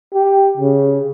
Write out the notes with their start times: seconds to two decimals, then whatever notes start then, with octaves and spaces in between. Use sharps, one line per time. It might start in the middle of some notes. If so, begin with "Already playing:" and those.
0.14 G4
0.57 C#3